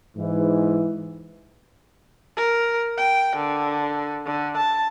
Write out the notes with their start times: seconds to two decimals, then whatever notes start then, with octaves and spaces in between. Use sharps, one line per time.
0.17 G#2 E3
2.37 A#4
2.98 G5
3.36 D3
4.26 D3
4.57 A5